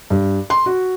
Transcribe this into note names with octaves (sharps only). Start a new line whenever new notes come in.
G2
C6
F#4